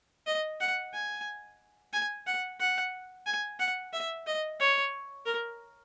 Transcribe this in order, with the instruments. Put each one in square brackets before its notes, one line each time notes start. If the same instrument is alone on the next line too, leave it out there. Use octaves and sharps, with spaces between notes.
[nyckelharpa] D#5
F#5
G#5
G#5
F#5
F#5
G#5
F#5
E5
D#5
C#5
A#4